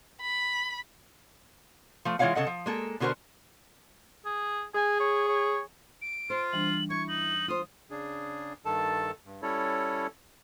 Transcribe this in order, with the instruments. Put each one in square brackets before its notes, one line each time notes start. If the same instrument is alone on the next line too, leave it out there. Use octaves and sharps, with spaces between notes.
[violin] B5
[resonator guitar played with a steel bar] F3 A3
E3 G#3 F4 C#5 F5 F#5
C#3 A4 D#5 F#5
F3
G#3 A#3 A4
B2 D3 F#4 A#4 C5
[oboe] G#4
[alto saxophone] G#4 [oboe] G#5
[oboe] C#5
C#5
[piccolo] D7
[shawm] F4 [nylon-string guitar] C5
[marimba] E3 G3 D4 [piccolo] F#7
[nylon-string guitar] E4 [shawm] C#6 [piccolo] G#6
[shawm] D#4 [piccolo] F#7
[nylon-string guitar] F4 C5 [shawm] D#6
[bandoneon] C#3 D4 G#4
G2 D#3 A4 A5
G2
G3 C#4 E4 A4 C#5